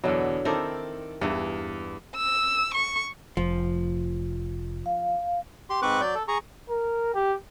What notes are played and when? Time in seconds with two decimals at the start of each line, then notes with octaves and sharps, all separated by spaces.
0.04 E2 B2 D3 F#3
0.45 D#3 C4 E4 A4 A#4 D5
1.21 E2 G2 E3
2.16 E6
2.74 C#6
3.37 F1 F3
4.86 F5
5.70 G4 C6
5.82 G#2 C4 B4 C#6 D6 F#6
6.01 F#3 D5 G6
6.15 A4
6.28 G#4 A#5 C#6
6.69 A#4
7.15 G4